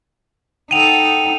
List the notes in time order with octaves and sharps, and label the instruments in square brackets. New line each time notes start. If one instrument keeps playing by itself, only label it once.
[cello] D#4 A4 [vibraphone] F#5 G5 [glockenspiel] D#7 F7